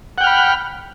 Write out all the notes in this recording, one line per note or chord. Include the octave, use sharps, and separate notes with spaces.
F#5 G5 B5 F6